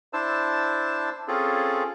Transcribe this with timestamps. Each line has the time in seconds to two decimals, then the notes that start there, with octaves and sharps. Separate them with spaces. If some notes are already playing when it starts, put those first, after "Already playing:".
0.13 D4 E4 C5 A5 E6
1.28 C4 C#4 F4 G#4 A4